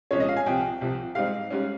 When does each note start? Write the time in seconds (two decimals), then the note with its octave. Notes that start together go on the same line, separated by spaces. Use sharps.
0.11 C2 A#2 F3 G#3 C#4 C#5
0.20 D#5
0.29 F5
0.36 G#5
0.46 C2 C3 F3 G5
0.81 C2 C3 F3
1.15 G#2 G3 C4 D#4 F5
1.50 G#2 G3 C#4